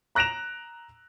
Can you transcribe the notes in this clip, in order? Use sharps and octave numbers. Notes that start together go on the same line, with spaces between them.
A#5 F#6 A#6 D7 E7 F7